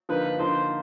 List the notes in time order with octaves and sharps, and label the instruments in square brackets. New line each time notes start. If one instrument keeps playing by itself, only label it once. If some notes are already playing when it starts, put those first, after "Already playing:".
[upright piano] D3 F3 A#3 D#4 [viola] B4
[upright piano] D3 F3 A#3 D#4 [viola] C5